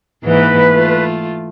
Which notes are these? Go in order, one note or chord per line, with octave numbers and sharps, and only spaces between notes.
G#2 E3 A#3 B4
A3 F4